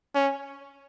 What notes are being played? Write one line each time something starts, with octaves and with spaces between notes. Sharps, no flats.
C#4